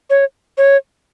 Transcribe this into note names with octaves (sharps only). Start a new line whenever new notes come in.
C#5
C#5